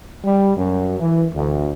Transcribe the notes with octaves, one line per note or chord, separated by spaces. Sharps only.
G3
F#2
E3
D2